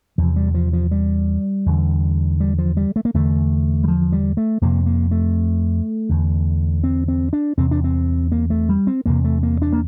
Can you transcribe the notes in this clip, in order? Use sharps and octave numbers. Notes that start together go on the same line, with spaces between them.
E2 C3 F3
G3
F3
F3
G3
E2 D3
G3
F3
G3
A3
A#3
E2 D3 A3
G3
F3
G3
A3
F2 C3 A#3
A#3
A3
E2 D3
C4
C4
D4
E2 C3 C4
D4
C4
A#3
A3
G3
C4
E2 C3 A#3
A3
A#3
D4
A#3